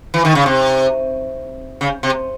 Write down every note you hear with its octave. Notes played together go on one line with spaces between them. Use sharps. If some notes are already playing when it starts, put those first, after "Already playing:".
E3
D#3
C#3
C3
C#3
C3